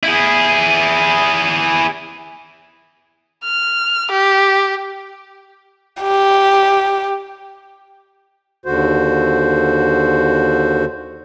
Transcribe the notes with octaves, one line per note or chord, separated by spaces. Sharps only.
E4 G#4
F6
G4
G4
D#2 D3 F#4 C5